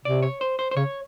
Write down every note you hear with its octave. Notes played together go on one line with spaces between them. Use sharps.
C3 D5
C#5
C5
C5
C5
C#3 C#5